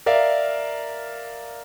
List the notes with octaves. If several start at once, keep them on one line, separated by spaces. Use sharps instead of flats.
A#4 D5 E5 F5